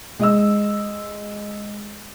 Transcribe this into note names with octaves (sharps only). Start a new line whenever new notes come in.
G#3 D#5 E6